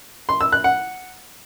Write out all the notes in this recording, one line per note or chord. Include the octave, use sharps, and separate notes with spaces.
C6
E6
F#6
F#5